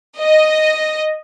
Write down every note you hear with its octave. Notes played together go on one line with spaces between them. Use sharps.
D#5